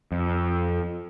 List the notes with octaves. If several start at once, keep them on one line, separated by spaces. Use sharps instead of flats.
F2